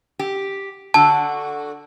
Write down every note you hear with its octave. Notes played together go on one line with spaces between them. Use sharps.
G4
D3 F#4 A5